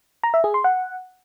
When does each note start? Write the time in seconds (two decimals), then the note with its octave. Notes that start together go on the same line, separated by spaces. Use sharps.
0.24 A#5
0.34 E5
0.44 G#4
0.54 C6
0.64 F#5